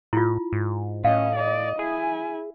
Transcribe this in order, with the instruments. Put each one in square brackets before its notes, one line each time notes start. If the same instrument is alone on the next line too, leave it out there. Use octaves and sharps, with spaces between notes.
[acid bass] A2 [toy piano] E4 F4
[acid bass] G#2
[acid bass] A2 [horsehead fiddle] C#4 D#5 [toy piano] F5
[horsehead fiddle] D5 D#5
[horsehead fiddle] E4 G#5 [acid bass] G#4